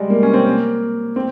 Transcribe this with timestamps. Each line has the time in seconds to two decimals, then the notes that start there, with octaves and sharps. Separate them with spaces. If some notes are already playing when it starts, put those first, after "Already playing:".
Already playing: G3 G#3
0.10 A#3
0.23 C#4
0.34 C4
0.46 A#3
1.16 C4